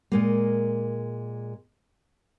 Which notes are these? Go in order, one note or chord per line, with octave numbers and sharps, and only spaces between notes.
A#2 G#3 A#3